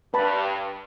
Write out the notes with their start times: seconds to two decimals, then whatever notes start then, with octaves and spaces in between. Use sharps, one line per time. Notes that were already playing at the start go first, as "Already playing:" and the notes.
0.14 G2 B4 A5 B5